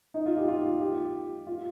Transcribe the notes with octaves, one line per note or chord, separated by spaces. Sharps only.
D#4
F4
G4
F4
G4
F4